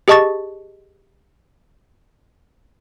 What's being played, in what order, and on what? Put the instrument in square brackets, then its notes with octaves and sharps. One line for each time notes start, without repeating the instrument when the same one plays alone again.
[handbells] G4 G#4 D#5 A5 C#6 A6